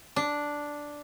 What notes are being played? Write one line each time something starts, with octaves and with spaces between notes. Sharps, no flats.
D4